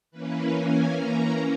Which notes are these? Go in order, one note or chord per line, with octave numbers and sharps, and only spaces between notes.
E3 A#3 C#4 B4
G#5
A#5